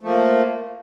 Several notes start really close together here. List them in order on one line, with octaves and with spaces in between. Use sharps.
A3 F3 A#3